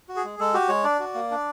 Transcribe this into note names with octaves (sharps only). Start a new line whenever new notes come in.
F#4
G#4
G#3
G#3 A4
F#4 G4
G#3 C#5
D4 D5
F#4
A#3
D4